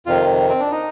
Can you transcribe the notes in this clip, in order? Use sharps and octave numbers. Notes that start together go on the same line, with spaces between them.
F2 C3 D#3 F4
C4
D4
D#4